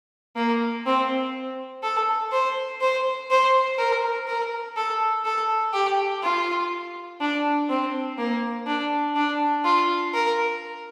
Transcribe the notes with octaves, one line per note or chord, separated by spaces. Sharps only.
A#3
C4
A4
C5
C5
C5
A#4
A#4
A4
A4
G4
F4
D4
C4
A#3
D4
D4
F4
A#4